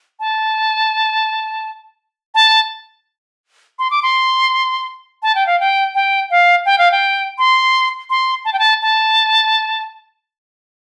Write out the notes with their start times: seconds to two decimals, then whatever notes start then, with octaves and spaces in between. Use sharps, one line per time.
0.20 A5
2.35 A5
3.79 C6
3.91 D6
4.03 C6
5.23 A5
5.35 G5
5.47 F5
5.60 G5
5.95 G5
6.31 F5
6.66 G5
6.78 F5
6.91 G5
7.38 C6
8.10 C6
8.45 A5
8.53 G5
8.59 A5
8.82 A5